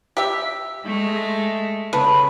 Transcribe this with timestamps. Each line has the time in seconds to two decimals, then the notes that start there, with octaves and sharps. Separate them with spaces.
0.17 G4 E5
0.85 G#3 A3
1.93 C#3 A4 B4